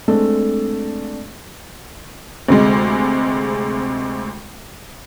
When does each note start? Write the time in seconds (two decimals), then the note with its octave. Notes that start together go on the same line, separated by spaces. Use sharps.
0.08 G#3 A3 C4 D4 A4 D5
2.48 D2 C3 G#3